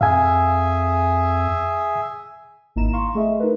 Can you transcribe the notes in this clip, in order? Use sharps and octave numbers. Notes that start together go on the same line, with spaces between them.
F2 G#4 E5 F5 G#5
G#1 A#3 D#4 E4 A#5 E7
F5 A#5 C6 C#6
A3 G#4 D#5 E5
D#4 A#4 B4